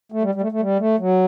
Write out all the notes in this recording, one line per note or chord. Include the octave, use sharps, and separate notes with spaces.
A3
G3
G3
A3
A3
G3
A3
F#3